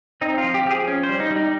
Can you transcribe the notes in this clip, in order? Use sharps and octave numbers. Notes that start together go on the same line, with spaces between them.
C4 D#4
F4
F3
G4
F3 G4
G#4
C#4
C5
G3
D#4
G3
D#4